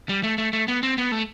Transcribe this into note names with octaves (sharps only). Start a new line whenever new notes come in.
G3
A3
A3
A3
B3
C4
B3
A3